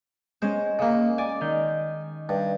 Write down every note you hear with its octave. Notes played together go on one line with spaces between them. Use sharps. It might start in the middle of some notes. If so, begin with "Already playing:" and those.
G#3 C#4 C5
C#3 A#3
D5 G#5
D#3 G6
G2